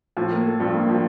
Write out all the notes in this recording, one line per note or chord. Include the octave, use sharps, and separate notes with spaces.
A2 F3
A#3
A4
G2 F3
A#3
F3